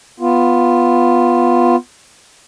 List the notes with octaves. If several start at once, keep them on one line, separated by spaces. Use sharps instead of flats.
B3 F4